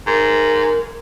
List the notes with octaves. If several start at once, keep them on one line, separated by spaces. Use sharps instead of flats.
G#2 A#4